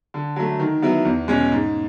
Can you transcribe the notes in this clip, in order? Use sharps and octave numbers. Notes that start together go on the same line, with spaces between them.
D3
F#3 A3
D#3
F#3 B3 E4
E2
B2 G#3 C#4
G#2